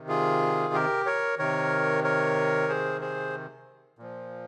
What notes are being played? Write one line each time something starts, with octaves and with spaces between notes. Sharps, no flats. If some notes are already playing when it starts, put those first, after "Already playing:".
Already playing: C3 D#3
F4 G#4
G4 A#4
A#4 C#5
C3 D#3 A#4 C#5
A#4 C#5
G#4 C5
G#4 C5
A#2 F3